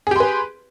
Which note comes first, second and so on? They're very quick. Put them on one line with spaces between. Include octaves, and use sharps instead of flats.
G#4 G4 C6 B4